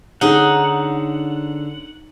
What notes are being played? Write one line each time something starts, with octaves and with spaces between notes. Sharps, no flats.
D3 C#4 D#4 G#4 F#5